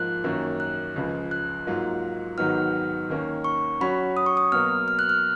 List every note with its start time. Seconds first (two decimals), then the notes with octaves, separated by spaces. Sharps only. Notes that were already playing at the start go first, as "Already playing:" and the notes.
Already playing: G#2 F3 A#3 F4 F#6
0.24 F#2 D#3 A#3 C#4
0.60 F#6
0.96 C#2 C#3 F3
1.31 F#6
1.67 G#2 F#3 A#3 F4
2.38 G#2 D#3 F#3 B3 D#4 F6
3.10 D#2 D#3 A#3 C#4
3.44 C#6
3.80 F#3 C#4 F#4 C#5 B5
4.17 D#6
4.26 C#6
4.37 D#6
4.52 B2 F#3 A#3 F6
4.88 F6
4.99 F#6
5.09 F6